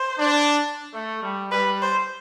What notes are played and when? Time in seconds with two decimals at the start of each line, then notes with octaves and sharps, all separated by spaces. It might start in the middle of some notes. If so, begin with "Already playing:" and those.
Already playing: C5
0.19 D4
0.93 A3
1.23 G3
1.51 G3 B4
1.82 C5